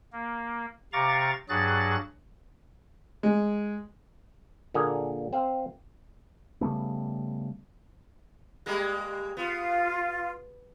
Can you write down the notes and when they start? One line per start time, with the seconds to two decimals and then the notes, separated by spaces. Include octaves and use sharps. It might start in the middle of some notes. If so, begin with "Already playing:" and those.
0.12 A#3
0.93 C3 F5 A#5 C#6 D6 A6
1.49 G2 F#3 F#4 G#4 F#6 A6
3.23 G#3
4.74 A#2 D3 A#3 G#4
5.33 C4 C5 F5
6.61 C#3 G3 A3 B3
8.66 G3 G#3 A#3
9.37 B3 F4